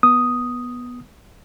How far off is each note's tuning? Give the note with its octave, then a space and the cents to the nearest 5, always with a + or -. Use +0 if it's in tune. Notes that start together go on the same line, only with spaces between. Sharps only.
B3 -10 D#6 +0